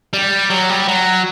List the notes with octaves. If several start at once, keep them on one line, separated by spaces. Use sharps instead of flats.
G3
F#3
G3
F#3